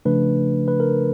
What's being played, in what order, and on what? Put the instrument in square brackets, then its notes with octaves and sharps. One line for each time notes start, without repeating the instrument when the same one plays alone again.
[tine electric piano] C#3 F3 A3 D4 B4
B4
A#4